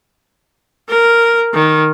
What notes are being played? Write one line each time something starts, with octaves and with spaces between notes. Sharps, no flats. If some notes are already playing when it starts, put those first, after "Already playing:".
A#4
D#3